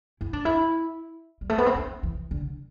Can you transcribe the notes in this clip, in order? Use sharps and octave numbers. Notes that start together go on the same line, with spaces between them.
E4
D4
E4
G3
A3
B3
C4
D4
E3
D3